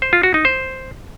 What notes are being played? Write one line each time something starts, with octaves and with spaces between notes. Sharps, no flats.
C5
F4
F#4
D#4
C5